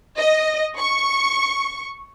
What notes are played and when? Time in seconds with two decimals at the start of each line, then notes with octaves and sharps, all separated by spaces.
0.19 D#5
0.77 C#6